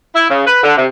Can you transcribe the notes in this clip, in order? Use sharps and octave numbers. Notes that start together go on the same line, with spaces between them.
E4
C#3
B4
D3
C3